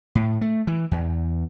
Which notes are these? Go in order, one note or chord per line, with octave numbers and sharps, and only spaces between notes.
A2
A3
E3
E2